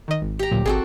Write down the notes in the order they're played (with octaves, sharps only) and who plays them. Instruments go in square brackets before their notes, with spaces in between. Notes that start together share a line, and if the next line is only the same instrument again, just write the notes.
[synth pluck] D#3 D#5
G#1
[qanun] G4 A#5
[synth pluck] D2 A#2 [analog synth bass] F#3
[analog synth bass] G#1 [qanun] C4 F#4 A4 [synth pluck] G#4